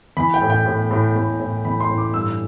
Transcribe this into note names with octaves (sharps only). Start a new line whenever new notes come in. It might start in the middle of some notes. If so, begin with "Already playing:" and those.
E3 B5
G5
A2
G5
A2
A2
A2
A2
E3 B5
C6
A2
D6
G2 E6